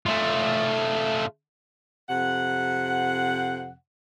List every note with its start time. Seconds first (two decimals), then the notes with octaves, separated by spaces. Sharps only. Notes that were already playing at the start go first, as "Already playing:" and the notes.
0.06 A3 F4
2.09 F2 C3 F#5